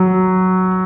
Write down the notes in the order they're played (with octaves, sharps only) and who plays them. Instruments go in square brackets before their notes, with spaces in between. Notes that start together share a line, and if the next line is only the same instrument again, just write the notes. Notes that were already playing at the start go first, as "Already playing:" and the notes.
Already playing: [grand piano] F#3